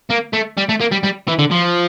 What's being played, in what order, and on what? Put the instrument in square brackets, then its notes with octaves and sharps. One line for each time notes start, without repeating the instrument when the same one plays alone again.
[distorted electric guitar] A#3
A3
G3
A3
A#3
G3
G3
E3
D3
F3